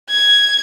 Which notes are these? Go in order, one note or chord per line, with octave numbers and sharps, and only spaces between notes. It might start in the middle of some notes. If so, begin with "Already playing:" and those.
G#6